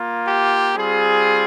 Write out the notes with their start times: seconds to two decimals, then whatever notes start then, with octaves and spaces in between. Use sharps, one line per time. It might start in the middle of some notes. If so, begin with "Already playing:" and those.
Already playing: A#3 F4
0.27 G4
0.76 G3 C4 F4 G#4